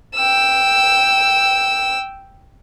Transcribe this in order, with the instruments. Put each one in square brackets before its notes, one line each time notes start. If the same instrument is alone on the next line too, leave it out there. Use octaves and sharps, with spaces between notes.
[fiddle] G5 E6